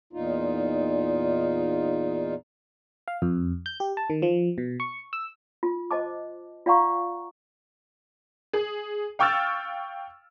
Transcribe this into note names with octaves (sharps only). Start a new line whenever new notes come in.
E2 A#2 D#4 F4
F5
F2
G6
G4
A5
D#3
F3
B2
C#6
E6
F4
C5 D#5 A5 D6
F4 D5 F5 F#5 A#5 C#6
G#4
F5 G5 C#6 E6 F6 A6